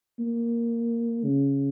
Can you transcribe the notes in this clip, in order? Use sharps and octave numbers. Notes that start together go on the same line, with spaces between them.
A#3
C#3